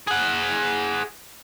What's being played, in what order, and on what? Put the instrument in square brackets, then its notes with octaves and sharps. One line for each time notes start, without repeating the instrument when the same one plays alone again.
[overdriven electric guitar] G#4 F#5